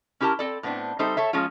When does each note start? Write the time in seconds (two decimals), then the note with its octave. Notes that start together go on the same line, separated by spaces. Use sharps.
0.20 C#4 E4 G4 A#4 A5
0.39 C4 A4 D5
0.63 A2 B3 C4 D4
0.99 G3 C4 D#4 A4 C5 E5
1.17 A4 C#5 E5
1.33 F3 G#3 C#4 F4